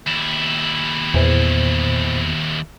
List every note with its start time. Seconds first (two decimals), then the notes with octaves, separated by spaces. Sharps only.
0.07 D#2 E4
1.14 E2 A#2 C5